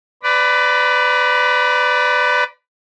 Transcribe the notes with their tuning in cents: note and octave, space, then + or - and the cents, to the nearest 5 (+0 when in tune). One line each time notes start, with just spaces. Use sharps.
B4 +25 D5 +0 B5 -40